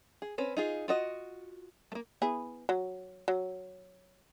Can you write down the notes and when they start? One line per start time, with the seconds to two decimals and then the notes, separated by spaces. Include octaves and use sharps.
0.22 G#4
0.38 C4 C#4 B4
0.57 D#4 F4 G#4
0.88 F4 F#4 D#5
1.92 A3 A#3
2.22 B3 E4 G#4
2.69 F#3
3.28 F#3